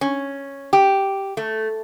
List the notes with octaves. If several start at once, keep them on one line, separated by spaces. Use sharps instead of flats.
C#4
G4
A3